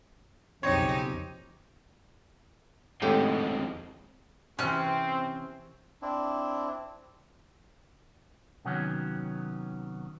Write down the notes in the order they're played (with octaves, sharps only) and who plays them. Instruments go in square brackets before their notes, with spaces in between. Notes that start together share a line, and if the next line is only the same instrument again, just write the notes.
[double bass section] B1 F2 C#3 [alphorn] C4 [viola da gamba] D#4 G4 [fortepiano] C#5
[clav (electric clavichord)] G#1 A2 G4 [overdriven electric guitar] F2 G#3
[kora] C3 E3 [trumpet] C4 [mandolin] C#4 F#6 [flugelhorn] C5
[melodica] C4 D4 E4
[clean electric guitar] C3 D#3 F#3 B3 C#4